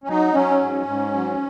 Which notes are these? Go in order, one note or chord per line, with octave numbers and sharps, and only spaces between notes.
C#4
F#3 D#4
F#3 C#4
G#2
G#2
F#3